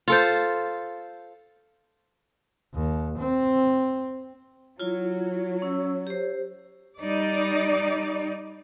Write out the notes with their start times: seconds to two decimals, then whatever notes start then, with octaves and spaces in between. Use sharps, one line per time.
0.08 F4 A4 C5
2.74 D#2
3.19 C4
4.80 F#3 E4 F4 C#5
5.62 C#4 E6
6.07 G4 C5
7.00 G3 D#4 D5